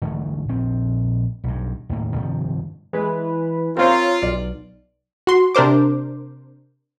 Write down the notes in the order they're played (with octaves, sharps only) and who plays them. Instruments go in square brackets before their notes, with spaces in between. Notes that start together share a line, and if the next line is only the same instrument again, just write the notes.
[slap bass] G#2 D3 E3 A3
A#1 C4
B1 G2
D#2 A2 A#3
G2 C3 D#3 F3
[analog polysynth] E3 B4 [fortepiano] G#3
[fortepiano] C4 C5 [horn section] F4 [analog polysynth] A#4 C#5
[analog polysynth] B1 [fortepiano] D5
[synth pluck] F#4 C6
C3 D4 A#4 C5 D6